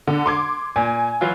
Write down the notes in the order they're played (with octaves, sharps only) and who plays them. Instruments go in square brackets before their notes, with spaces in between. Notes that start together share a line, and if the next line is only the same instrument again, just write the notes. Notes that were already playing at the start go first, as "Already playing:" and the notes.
[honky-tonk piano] D3
C6 D6 G#6
[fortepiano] A#2 [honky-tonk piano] G#5
[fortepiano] E3 F#3 F4